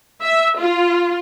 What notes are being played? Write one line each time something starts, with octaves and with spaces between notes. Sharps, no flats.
E5
F4